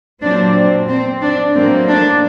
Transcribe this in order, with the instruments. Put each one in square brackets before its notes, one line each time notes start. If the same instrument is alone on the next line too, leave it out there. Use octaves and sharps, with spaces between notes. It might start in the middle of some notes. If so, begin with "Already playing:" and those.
[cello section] A#2 F#3 C4 D4
C4
D4
A2 F#3 A#3 C4
D4